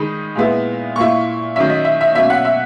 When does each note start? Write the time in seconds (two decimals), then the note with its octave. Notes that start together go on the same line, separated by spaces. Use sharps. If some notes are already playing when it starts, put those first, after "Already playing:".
Already playing: D#3 G#3 D#4 B5
0.35 A#2 G#3 B3 E4
0.96 A#2 A#3 E4 C#6
1.56 D#3 F#3 C#4 E5
1.70 D#5
1.85 E5
2.01 E5
2.15 B2 F#3 A#3 C#4 E5
2.30 F#5
2.45 E5